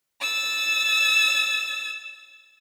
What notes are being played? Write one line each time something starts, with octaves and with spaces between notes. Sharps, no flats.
E6 A6